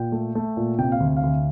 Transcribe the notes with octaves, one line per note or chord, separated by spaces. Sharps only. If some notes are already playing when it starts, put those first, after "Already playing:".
Already playing: A#2 G5
A3
A3
A#2
C3 G5
F5
D2
F5
D2